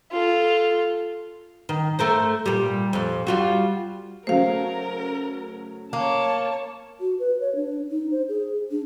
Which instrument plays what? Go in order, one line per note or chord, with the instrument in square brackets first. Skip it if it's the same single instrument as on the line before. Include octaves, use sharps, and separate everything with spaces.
[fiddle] F4 A4
[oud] D#3
A3 A#4 C5
A#2 G3
F2 A#2
G3 F4 F#4
[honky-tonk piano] C#3 F#3 A3 [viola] A#4 [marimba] C5 F5
[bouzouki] A#3 [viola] C#5 A5
[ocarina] F#4
B4
C#5
D4
D#4
C5
G#4
D4